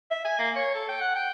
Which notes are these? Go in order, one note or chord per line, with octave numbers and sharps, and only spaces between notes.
E5
G#5
A#3
C#5
A4
G5
F#5
G5